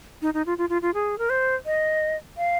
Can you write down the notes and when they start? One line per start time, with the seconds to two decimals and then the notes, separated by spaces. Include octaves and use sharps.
0.22 D#4
0.34 D#4
0.46 F4
0.58 F4
0.69 F4
0.82 F4
0.94 G#4
1.18 A#4
1.30 C5
1.66 D#5
2.37 F5